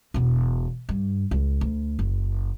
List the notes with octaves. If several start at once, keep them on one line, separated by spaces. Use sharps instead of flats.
E1 B2
G2
C#2
D2
F#1